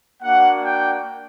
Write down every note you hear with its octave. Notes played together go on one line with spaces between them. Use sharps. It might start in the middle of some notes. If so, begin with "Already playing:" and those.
A#3 D4 F#4 F#5
G5